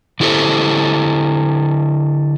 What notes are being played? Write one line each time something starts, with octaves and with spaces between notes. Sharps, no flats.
D3 E4 G4 A4 C5